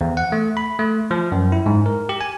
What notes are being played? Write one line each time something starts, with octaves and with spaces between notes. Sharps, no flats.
E2
F#5
A3
B5
A3
F3
F#2
E4
G#2
A#4
G4
G#5